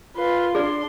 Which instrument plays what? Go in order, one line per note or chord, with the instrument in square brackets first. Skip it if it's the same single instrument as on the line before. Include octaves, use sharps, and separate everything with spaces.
[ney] F4 [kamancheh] B4 C6
[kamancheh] D4 C6 [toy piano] G#4 D5